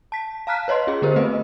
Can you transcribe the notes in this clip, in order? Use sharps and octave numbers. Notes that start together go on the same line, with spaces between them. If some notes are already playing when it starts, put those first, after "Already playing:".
A5 B6
F5 A5 A#5 F6 F#6 B6
B4 C#5 D#5 C6
C#4 F4 G#4 D#5
D3 B3 G4 A#4 C5
A3 C4 B4 D#5